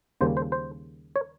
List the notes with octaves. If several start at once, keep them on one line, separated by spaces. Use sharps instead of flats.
D#2 C#3 G3 A#3 C5
C5
C5
C#5